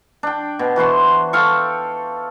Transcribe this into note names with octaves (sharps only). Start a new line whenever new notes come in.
D4 G5
B2
E3 F#4 C5 C6
A4 F5 G5 C#6